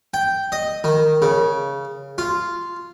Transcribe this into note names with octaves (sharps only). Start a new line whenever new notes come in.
G5
D#5
D#3
C#3
F4